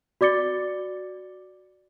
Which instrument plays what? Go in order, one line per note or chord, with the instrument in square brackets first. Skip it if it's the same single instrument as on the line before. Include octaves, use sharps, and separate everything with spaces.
[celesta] F#4 D5 D6 A6 C#7 G7